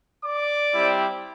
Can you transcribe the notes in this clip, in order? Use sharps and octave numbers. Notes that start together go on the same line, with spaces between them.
D5 D6
G3 C4 E4 G4